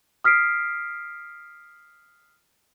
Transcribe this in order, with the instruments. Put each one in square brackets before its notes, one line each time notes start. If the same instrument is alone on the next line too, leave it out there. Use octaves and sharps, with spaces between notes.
[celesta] D#6 F6 B6 C7 D7